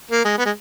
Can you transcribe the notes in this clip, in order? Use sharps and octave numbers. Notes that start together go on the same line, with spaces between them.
A#3
G#3
B3
G#3